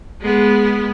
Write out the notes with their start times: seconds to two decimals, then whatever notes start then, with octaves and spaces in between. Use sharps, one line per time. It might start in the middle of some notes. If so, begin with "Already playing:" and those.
0.21 G#3 B3